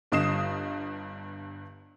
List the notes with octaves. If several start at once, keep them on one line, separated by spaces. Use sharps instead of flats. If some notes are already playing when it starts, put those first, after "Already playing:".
G1 G2 D#5 D#6 C7 E7